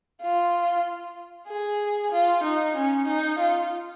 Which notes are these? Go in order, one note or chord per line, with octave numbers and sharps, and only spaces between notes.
F4
G#4
F4
D#4
C#4
D#4
F4